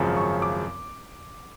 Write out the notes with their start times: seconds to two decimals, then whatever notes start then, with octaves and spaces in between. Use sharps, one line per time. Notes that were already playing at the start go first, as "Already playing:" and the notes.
Already playing: G#1 F#2 C#3 F3
0.17 C#6
0.42 D6